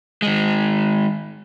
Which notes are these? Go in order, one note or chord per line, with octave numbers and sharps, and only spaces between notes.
D#3 G#3